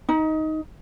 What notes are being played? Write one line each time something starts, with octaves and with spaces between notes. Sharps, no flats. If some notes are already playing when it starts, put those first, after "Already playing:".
D#4